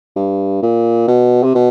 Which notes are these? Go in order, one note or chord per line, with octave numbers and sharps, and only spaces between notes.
G2
A#2
B2
C3
B2